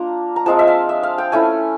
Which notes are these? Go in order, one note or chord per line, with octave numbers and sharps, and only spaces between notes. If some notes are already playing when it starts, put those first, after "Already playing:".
Already playing: A#3 D4 F4 A#5
A#5
F3 G#3 C4 F4 A5
E5
F5
E5
F5
G5
A3 C#4 E4 G#5